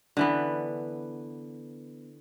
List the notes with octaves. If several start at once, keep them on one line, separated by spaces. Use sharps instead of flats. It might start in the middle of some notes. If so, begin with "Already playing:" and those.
D3 E3 B3